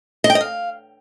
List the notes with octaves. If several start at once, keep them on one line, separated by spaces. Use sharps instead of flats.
D#5
G5
D#5
F5